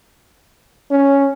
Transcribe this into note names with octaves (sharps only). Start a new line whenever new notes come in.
C#4